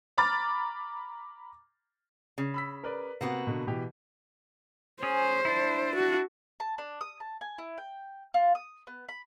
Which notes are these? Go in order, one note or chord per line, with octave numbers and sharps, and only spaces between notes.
A#5 B5 D6 F6 A6
C#3
B5 E6 B6
A#4 B4 D5
C3 A#3 B3 F#4
B2 D3
B2 E3 G4
C#4 G#4 C5
D4 E4
F#4
A5
D4
D#6
A5
G#5
E4
G5
F4
D#6
B3
B5